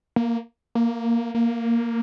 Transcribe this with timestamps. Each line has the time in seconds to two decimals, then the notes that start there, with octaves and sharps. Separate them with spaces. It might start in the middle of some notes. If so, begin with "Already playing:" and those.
0.16 A#3
0.75 A#3
1.35 A#3